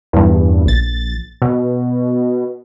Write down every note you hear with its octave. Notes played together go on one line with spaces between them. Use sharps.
E2 G2
A#1 A6
B2